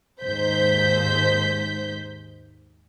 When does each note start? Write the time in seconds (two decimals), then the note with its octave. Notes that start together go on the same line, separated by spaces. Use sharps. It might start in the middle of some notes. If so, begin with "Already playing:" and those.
0.24 D#2 G#2 C5 G6 B6